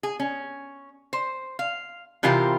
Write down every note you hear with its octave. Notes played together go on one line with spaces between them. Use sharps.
G#4
C#4
C5
F5
C3 E3 C4 F4 G4 A#4